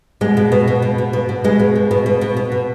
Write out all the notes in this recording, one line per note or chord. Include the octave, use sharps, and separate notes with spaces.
B2 G#3
B2
B2
B2
B2
B2
B2
B2
B2 G#3
B2
B2
B2
B2
B2
B2
B2